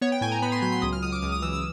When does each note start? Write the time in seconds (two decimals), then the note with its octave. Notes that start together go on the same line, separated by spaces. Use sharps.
0.01 B3 C#5
0.12 G5
0.21 A2 G#5
0.32 A#5
0.42 B3 B5
0.52 C6
0.62 F#3 B5
0.72 C6
0.82 C#2 D#6
0.93 F6
1.02 C#2 D#6
1.12 D6
1.22 C#2 D#6
1.32 D#6
1.42 E3 E6
1.53 E6